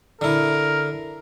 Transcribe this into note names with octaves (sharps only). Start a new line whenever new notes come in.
D3 E4 A#4